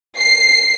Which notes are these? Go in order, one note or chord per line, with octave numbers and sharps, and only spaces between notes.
C7